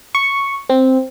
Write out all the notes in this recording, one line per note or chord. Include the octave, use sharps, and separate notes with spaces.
C#6
C4